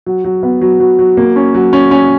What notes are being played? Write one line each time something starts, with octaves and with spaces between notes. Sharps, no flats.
F#3
F#3
B3
F#3
F#3
F#3
A#3
C#4
F#3
C#4
C#4